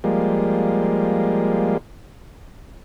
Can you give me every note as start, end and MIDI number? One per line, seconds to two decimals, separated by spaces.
0.04 1.77 53
0.04 1.77 55
0.04 1.77 56
0.04 1.77 58